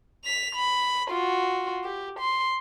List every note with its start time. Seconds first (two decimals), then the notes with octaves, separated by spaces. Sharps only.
0.25 B6 F7
0.55 B5
1.10 F4 F#4
1.84 G4
2.19 C6